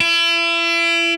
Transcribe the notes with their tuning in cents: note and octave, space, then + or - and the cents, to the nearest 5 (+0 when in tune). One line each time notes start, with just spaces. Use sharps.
E4 +35